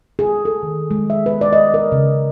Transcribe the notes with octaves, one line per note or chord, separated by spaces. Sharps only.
G#4
A4
D#3
G#3
E5
B4
D5
D#5
A#4
C#3